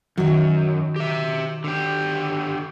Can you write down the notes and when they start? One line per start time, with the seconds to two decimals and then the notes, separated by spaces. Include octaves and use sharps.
0.17 F#2 D#3 F#3
0.96 G4 E5
1.64 D3 G4